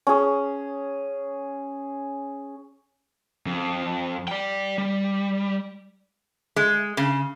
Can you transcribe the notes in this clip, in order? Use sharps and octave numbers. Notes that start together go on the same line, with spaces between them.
C#4 G#4
F2
D5 G5
G3
G#3
C#3